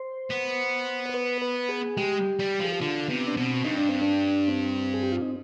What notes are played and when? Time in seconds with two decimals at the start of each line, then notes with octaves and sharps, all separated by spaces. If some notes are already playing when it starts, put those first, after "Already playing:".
Already playing: C5
0.30 B3
1.09 C5
1.14 B4
1.42 B4
1.69 G#4
1.97 G#3 G4
2.39 G3
2.60 F3 G#4
2.72 G4
2.80 D3 F4
3.08 C3 B3
3.27 D4
3.36 B2 C4
3.64 G2 D#4
3.76 D4
3.89 C4
4.02 D4
4.48 C4
4.94 G#4
5.03 G4
5.12 F4
5.22 D#4